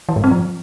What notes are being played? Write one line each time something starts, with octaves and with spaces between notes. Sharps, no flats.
E3
G#2
C4
F3